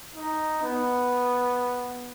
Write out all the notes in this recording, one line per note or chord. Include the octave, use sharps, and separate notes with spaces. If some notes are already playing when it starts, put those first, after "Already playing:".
D#4
B3